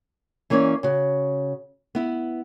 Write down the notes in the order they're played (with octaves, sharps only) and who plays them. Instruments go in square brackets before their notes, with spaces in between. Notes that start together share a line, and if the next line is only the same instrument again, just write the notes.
[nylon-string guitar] E3 A#3 C#4 C#5 D5
C#3 F#4
B3 E4